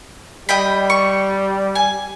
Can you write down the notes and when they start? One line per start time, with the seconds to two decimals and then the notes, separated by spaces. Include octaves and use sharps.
0.49 G3 D#5 G5 B5
0.90 C#6
1.75 G#5